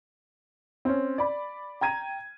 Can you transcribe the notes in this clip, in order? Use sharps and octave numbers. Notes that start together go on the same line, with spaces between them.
C4 C#4
D5 B5
G5 A#5 G#6 D#7